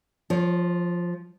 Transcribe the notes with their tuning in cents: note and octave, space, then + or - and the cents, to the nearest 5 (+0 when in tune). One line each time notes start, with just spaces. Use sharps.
F3 +0 C#5 -35